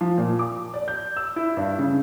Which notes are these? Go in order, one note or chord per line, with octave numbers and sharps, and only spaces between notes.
F3
A#2
D6
D5
G6
E6
E4
G2
C#3